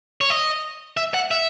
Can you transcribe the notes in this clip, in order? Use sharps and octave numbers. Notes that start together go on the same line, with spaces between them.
C#5
D#5
E5
F#5
E5